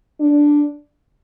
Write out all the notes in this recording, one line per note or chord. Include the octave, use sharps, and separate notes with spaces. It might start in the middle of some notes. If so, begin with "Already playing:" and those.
D4